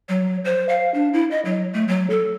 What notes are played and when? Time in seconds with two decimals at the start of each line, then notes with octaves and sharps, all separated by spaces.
0.09 F#3
0.45 C5
0.69 F5
0.94 D4
1.13 E4
1.31 D#5
1.45 F#3
1.74 A3
1.88 F#3
2.10 A4